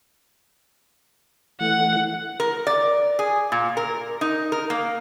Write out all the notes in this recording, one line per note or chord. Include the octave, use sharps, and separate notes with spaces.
E3 A3 F#5
A#4
D5
G#4
A#2
A#4
D#4
A#4
A#3